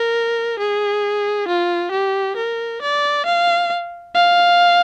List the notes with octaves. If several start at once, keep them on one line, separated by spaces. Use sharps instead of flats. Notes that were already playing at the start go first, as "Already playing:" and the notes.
Already playing: A#4
G#4
F4
G4
A#4
D5
F5
F5